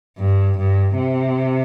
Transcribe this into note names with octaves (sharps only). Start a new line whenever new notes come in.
G2
G2
C3